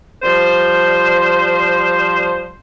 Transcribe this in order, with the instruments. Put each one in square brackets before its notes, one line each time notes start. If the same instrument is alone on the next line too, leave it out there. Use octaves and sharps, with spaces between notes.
[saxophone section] F3 G3 C5